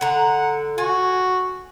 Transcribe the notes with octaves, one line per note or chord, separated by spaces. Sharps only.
D3 F#5 A#5
F#4 G#5